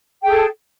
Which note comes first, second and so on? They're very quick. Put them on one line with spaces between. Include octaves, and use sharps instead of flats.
G5 G#4 A4